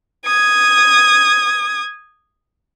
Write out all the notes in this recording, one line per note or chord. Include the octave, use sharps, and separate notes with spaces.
D#6 G#6